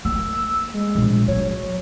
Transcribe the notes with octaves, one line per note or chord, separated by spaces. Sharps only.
A#3 E6
G#3
A#1 D4
F#3 C#5